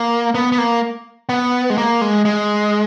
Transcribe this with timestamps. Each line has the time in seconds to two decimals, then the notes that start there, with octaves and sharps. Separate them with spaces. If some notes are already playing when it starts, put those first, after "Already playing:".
Already playing: A#3
0.35 B3
0.52 B3
0.58 A#3
1.29 B3
1.70 G#3
1.78 A#3
2.01 G#3
2.25 G#3